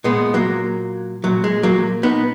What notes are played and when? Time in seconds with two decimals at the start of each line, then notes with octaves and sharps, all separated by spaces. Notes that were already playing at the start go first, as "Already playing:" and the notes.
0.04 A#2 G#3 B3
0.34 F#3 A#3
1.24 A#2 F#3
1.44 G#3
1.63 F#3 A#3
2.03 B3 D#4